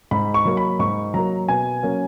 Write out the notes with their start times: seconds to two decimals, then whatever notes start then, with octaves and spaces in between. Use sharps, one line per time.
0.11 G#2 B5
0.34 C#6
0.45 F#3 A#3
0.57 B5
0.79 G#2 C#6
1.14 F#3 A#3 A#5
1.48 B2 G#5
1.83 F#3 A#3 C#4